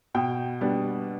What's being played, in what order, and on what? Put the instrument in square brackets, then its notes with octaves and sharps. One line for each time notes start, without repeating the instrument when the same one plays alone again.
[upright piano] B2 G5
G3 B3 D4